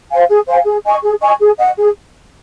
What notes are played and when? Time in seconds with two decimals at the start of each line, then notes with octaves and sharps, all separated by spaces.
0.11 C5 F5 G#5
0.30 G#4
0.48 C5 F5 G#5
0.67 G#4
0.85 D#5 G#5 C#6
1.03 G#4
1.22 D#5 G#5 C#6
1.40 G#4
1.59 D#5 F#5
1.77 G#4